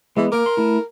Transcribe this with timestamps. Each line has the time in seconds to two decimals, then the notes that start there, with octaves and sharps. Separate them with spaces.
0.17 E3 G#3 B3
0.32 A#3 A#4 D6
0.46 C6
0.57 A3 E4